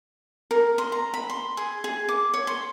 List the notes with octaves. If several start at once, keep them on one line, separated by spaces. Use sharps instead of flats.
A#4
C6
A#5
B5
C6
G#4
G#4
D6
C#5
C6